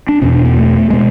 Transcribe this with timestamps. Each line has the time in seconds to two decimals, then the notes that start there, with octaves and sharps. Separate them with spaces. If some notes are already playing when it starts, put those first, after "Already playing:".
0.09 D4
0.22 E2 B2 C#4
0.33 D4
0.45 B3
0.57 A3
0.90 B2 G#3